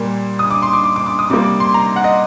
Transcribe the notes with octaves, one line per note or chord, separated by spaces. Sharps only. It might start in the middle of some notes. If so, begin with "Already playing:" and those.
Already playing: A#2 G3 A#3
D#6
D6
C6
D6
D6
D6
D6
D#6
C3 G3 A#3 D6
D6
C6
A#5
F#5
D#5